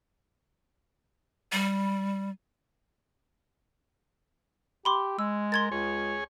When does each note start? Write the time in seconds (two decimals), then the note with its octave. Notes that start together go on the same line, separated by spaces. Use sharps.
1.52 G3
4.85 G4 B5 C6 D6
5.19 G#3 E6
5.52 A#4 C6 G#6 A6
5.72 C#2 G#4 C#5 G#5